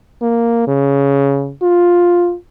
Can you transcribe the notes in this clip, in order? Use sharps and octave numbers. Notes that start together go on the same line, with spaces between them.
A#3
C#3
F4